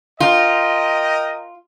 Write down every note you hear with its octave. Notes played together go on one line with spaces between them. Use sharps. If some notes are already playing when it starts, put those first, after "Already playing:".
F4 A#4 D#5 G5